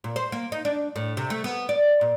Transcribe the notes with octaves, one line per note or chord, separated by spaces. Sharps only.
A#2
C5
A#3
D#4
D4
A2
C3
A3
B3
D5
A#2